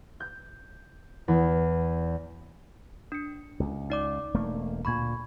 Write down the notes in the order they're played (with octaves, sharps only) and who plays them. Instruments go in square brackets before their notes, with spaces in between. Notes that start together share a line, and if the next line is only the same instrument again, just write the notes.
[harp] G6
E2
[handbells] D4 C#7
[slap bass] C#2
[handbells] D#4 D5 D6
[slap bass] E1 A3 A#3
[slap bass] D2 A#2 [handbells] B5 C#6 G#6